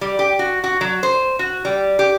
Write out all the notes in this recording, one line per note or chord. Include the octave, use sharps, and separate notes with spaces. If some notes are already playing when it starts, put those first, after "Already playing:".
G3
G4
F#4
F#4
F#3
C5
F#4
G3
G4